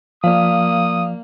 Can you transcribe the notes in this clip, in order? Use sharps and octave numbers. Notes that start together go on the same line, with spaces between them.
F3 A#3 D5 F5 D#6